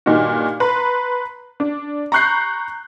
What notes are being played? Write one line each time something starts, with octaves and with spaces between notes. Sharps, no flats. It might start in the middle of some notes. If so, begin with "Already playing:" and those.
G2 A#2 D#3 D#4 F#4
B4 A#5 C6
D4
A#5 B5 C#6 F#6 G6 C7